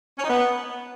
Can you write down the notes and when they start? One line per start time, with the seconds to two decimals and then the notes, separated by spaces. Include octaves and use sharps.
0.19 C#4
0.24 D#4
0.29 B3